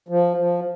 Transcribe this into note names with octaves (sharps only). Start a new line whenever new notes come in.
F3
F3